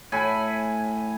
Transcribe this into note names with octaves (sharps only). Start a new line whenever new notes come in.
A2 G#5 B5